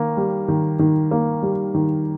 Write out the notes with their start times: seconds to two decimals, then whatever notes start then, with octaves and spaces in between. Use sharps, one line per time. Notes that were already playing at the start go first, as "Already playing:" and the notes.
Already playing: D#3 A#3
0.17 G3
0.48 D#3
0.79 D#3
1.11 A#3
1.42 G3
1.74 D#3